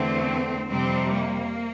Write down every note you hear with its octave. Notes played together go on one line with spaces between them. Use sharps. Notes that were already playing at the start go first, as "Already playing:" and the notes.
Already playing: E2 D3 A3 C4
F2 C3 G3 C4
A#3